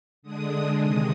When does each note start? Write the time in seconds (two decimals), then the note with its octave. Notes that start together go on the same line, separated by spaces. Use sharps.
0.22 D3 G#3 D4 D#6
0.81 C3 D#3 G#3 D#6